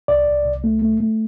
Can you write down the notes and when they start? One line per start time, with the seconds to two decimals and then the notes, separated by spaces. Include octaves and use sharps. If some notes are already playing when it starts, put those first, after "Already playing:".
0.08 C2 D5
0.26 C2
0.45 C2
0.64 A3
0.82 A3
1.00 A3